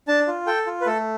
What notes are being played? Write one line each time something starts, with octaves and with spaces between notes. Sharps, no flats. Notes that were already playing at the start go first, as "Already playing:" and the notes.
D4 A5
F4
A4 G5
F4
B4
A3 A4